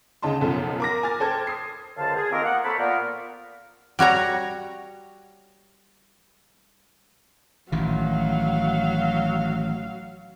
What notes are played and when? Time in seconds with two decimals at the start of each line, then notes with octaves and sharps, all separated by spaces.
0.22 D2 C#3 D#4 A5 C6
0.41 B1 F#2 F3 A4
0.80 A#4 D6 A#6
1.03 G#5 F6 A6
1.20 A4 C5 G5 A5 G#6
1.47 D#6 C7
1.97 C#2 F#2 D3 C5 F5 A5
2.16 G#4
2.31 D#3 A#3 C4 F4 A#4
2.43 A#3 B3 F#5
2.64 A4 A#4 C5 C#5 A5 B5
2.78 A#2 B3 A#4 F5
3.99 G3 F#4 C#5 A#5
7.72 A1 D#3 F#3 F5